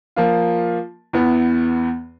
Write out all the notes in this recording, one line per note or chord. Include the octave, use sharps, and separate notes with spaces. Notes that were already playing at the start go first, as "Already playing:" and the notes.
F3 A#3 F4
E2 E3 B3